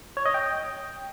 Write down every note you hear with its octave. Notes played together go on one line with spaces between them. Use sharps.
C#5
D#5
G5